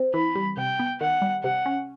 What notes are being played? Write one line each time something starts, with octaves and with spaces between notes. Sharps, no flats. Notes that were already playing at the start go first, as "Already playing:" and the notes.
Already playing: C4
E3 B5
G3
C3 G5
B3
D#3 F#5
G3
C3 F#5
C#4